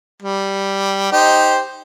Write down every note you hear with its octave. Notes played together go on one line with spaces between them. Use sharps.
G3
D#4 G4 C5